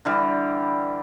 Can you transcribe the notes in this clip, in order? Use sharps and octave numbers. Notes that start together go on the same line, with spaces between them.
D3 E3 G3